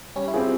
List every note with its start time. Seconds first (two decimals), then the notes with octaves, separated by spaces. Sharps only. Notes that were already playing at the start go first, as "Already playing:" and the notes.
0.15 G3 C#4
0.28 E4
0.34 C4 F4 G4 G#4